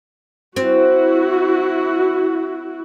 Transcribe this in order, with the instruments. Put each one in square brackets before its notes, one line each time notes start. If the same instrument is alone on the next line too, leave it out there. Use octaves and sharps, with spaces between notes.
[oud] C4 [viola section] E4 F#4